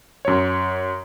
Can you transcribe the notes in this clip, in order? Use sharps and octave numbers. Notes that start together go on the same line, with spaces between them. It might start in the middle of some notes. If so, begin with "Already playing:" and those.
F#2 C#5